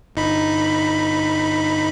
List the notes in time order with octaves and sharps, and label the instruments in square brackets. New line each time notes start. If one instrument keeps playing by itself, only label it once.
[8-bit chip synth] G1 D#4 B5